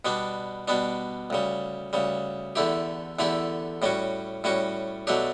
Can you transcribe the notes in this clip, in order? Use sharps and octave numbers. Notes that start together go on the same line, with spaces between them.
B2 G3 B3 D4
B2 G3 B3 D4
D2 C#3 G3
D2 C#3 G3
E2 D3 A3 E4 G4
E2 D3 A3 E4 G4
A2 G3 C#4 F#4
A2 G3 C#4 F#4
B2 F#3 A3 D4 G4